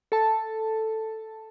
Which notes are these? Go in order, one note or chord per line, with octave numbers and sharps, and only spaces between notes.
A4 A5